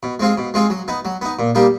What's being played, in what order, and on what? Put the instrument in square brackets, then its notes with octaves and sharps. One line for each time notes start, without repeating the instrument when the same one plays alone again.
[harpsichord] B2
G#3 C4 F4 G#4
B2
G#3 C4 F4 G#4
F#3
B3 D#4
F#3
B3 D#4
A#2
G3 A#3 D#4 G4